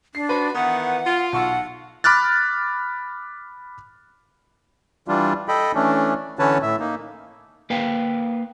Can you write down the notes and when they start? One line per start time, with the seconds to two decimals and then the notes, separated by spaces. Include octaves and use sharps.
0.15 D4 C7
0.29 F#4 B4 C5
0.55 D#3 E3 B3 F#5 D#6
1.06 F4
1.33 B1 F#5 C#6 E6
2.04 B5 D6 F6 F#6 A6
5.08 E3 G3 D4 F4
5.48 A4 D#5 G5 B5
5.75 E3 A3 C#4 D4
6.39 D3 E3 C#4 B4 C#5 A5
6.62 A2 E5
6.80 A#3 D#4
7.70 A#3 B4 F5 G5